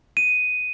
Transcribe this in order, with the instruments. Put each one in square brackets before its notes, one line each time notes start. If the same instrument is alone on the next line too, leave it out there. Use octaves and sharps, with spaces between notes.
[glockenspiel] D#7